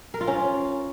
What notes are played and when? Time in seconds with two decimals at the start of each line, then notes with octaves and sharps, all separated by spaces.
0.14 A#4
0.21 F4
0.27 C#4